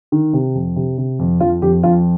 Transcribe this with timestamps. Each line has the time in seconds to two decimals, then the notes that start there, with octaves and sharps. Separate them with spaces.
0.12 D#3
0.33 C3
0.55 F2
0.76 C3
0.98 C3
1.19 F2
1.40 F2 F4
1.62 F2 G4
1.83 F2 F4